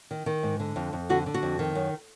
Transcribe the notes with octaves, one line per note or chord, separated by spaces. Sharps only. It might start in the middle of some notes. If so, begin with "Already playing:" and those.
D#3
D#3
G#2
D3
F2
F2
D3 F#4
D3
F#4
F2
D#3
F#2